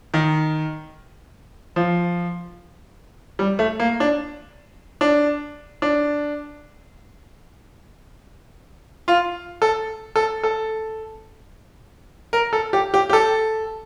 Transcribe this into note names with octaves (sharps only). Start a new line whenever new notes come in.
D#3
F3
G3
A3
A#3
D4
D4
D4
F4
A4
A4
A4
A#4
A4
G4
G4
G4
A4